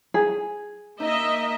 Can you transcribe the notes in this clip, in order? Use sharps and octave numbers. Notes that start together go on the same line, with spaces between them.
G#4
A#3 D#4 D#5 E5